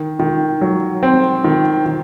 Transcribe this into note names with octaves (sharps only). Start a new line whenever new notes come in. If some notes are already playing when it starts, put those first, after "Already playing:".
Already playing: D#3
D#3
F#3
C4
D#3
D#3